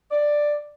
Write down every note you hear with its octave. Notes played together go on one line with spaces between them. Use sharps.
D5